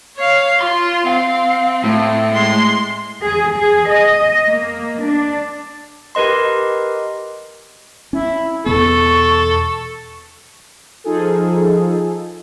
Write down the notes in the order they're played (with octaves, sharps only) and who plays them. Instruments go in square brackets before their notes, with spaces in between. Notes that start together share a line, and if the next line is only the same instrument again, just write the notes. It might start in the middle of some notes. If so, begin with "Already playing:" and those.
[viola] C#5 F5
[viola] F4 [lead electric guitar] C6
[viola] C4 [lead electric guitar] F5
[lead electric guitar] A2
[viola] G#3 C6
[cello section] G#4
G#4
D#5
A#3
D4
[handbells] G4 A#4 B4 D#5 C6
[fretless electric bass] C#4 [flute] E4
[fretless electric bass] E2 B2 B3 [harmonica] A4 [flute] C#6
[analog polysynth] F3 D#4 F4 G#4 A4